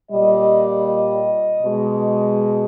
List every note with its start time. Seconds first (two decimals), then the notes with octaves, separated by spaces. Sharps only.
0.11 A#2 G3 D#5
0.87 D#5
1.63 B2 G#3